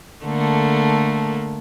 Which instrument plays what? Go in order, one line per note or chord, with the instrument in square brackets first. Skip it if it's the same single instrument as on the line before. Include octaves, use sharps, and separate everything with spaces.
[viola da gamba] D3 A3 A#3